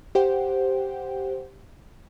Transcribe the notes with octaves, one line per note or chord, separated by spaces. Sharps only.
G4 C5 F#5 G5